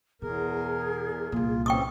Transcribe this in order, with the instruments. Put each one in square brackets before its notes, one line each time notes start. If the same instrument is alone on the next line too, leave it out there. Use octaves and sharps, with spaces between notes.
[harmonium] E2 A#4 [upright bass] B2 [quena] G#4
[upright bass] C2 A#2 [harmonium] F4
[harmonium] E3 C4 C#4 [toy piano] G5 C#6 D#6